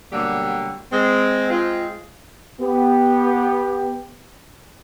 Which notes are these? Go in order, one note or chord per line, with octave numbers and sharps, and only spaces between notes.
B2 D3 F#3 G3 A#3 G4
G#3 C4
G#3 C4 F4
B3 G4